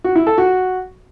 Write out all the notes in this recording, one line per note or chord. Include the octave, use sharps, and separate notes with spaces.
F#4
E4
A4
F#4